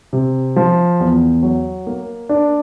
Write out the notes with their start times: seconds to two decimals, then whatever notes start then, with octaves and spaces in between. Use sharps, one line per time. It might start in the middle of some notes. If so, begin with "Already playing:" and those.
0.13 C3
0.56 F3
1.00 E2
1.43 F#3
1.87 A#3
2.29 D4